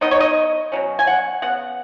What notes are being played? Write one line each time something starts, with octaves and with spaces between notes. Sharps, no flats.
D#3 B3 D#4 D#5
C#5
D#5
B2 F#3 C#4
G#5
F#5
C#3 B3 F#5